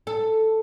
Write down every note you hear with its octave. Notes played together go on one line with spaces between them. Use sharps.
A4